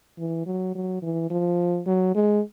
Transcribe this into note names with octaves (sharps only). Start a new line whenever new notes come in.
E3
F#3
F#3
E3
F3
F#3
G#3